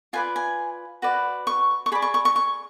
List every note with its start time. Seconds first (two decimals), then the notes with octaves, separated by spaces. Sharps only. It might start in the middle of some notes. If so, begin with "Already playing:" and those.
0.13 F4 B4 D5 G#5
0.36 G#5
1.02 F#4 B4 D5
1.47 C#6
1.86 C#6
1.92 G#4 B5
1.95 D5
2.02 C#6
2.14 C#6
2.25 C#6
2.36 C#6